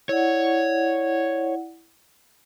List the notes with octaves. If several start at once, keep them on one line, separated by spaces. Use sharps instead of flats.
E4 C#5 D5 F#5